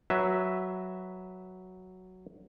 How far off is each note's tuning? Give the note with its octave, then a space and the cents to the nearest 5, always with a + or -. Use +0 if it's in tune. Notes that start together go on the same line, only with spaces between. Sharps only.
F#3 +0 B4 -10 E5 +0